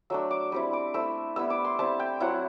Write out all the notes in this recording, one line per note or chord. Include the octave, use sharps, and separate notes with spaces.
F#3 A3 D4 E6
D6
G3 C4 E4
D6
A3 C4 E4 E6
G3 B3 E4 E6
D6
C6
G3 C4 E4 A5
G5
F#3 C4 E4 F#5